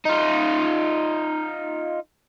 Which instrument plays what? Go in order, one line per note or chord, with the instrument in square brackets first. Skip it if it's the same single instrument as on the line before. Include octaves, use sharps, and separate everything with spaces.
[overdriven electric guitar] D#4 F4